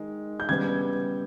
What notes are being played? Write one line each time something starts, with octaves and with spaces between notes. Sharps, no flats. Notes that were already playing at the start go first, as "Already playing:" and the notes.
Already playing: D#3 G#3
G6
C#3 G3 B3 G#6